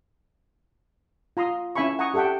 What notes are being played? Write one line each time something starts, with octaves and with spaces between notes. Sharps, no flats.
F4 A#5 C6 D#6
C#4 E4 E5 G#5 B5 C#6
F#5 G#5 A#5 C#6 D#6
G4 A4 E5 F#5 G5